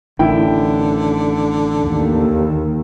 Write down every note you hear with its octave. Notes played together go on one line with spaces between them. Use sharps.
A1 D3 D#3 E4 G5
D#2